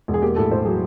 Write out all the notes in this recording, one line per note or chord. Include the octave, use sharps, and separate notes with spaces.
E1
G#4
A#3 G4
A2 A4
A2 C5
F#3 G#4